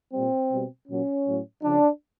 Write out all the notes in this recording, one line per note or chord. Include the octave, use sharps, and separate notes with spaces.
A#2 G3 C4
B2 G3
A#2 F#3 C#4
A2 F#3
C#3 F3 D4